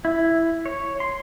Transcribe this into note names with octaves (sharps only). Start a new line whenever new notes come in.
E4
C#5
C6